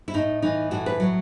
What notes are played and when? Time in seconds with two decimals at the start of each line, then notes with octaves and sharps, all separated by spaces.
0.08 E4
0.14 A2 D#4
0.42 E3 D#4
0.71 A2 F#4
0.86 B4
1.00 F#3